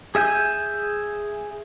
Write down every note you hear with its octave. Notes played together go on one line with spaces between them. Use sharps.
G#4 E5 G#5 G6